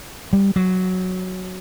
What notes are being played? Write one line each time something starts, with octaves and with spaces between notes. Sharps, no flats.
G3
F#3